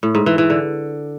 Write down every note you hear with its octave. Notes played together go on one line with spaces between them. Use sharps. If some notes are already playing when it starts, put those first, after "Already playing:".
A2
G#2
E3
E3
D3